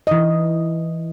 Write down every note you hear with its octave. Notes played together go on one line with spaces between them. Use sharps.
E3 D#5